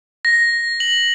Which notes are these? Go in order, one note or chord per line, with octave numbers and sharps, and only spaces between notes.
A#6
F#7